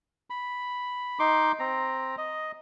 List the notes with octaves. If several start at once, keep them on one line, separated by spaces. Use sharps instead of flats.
B5
D#4 C6 D6
C4 A#5
D#5